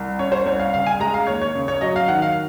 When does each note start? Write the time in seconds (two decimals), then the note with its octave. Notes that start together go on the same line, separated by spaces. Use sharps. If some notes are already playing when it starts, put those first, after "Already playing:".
Already playing: C2
0.19 C#4 C#5
0.32 C5
0.46 C2 C#5
0.59 F5
0.74 C#3 F5
0.86 G#5
1.00 G#3 A#5
1.14 F5
1.27 D#2 C#5
1.41 C#5
1.55 C#3
1.68 C#5
1.81 F#3 D#5
1.96 F5
2.08 D#3 F#5
2.22 F5